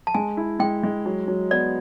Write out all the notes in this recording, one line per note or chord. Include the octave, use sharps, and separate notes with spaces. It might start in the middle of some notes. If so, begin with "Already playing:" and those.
A5
G#3 G#5
E4
G#3 G5
G#3
F#3
F#3
B3 D5